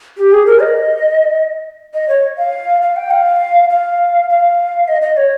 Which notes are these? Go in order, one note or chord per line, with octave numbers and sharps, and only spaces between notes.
G4
G#4
A#4
D#5
D#5
C#5
F5
F5
G5
F5
F5
F5
D#5
D#5
C#5